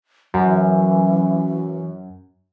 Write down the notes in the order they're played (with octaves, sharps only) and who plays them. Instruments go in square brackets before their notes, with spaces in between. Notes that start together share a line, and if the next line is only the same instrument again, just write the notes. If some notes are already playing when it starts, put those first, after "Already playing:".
[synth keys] F#2 [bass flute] E3